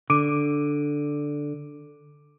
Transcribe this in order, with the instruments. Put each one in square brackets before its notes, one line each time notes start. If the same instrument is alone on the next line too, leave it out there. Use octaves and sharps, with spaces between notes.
[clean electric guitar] D3 [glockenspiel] D6 D7 D#7